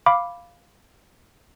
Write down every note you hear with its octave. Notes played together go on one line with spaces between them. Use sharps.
F5 B5 D6